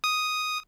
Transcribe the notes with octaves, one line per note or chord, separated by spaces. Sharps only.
D#6